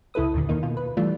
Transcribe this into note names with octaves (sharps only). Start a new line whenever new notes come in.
C#2 E4 A4 B4 D#6
D#2 A#2 D3
D#2 A#2 D#3 A#3 D#4
B2 F4
B4
E3 G3 A3 D4 F4